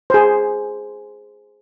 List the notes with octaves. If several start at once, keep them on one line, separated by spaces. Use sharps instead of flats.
G#4 C5